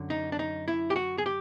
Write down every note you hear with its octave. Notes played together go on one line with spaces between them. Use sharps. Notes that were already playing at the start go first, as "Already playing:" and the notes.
Already playing: F#2 D3 F#3
D#4
D4
D#4
E4
G4
F#4
G#4
G4